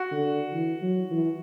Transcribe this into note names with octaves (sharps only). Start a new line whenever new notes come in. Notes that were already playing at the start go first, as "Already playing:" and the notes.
Already playing: F#4
D3
E3
F#3
E3